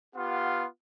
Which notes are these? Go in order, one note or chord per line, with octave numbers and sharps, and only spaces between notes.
B3 F4 G4 F5 F#5 C6